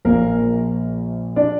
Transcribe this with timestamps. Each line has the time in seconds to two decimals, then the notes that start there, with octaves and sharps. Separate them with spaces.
0.05 A#1 A#2 F3 A#3 A#4
1.36 D4 D5